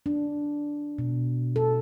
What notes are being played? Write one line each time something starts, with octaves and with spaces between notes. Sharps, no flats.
D4
B2
A4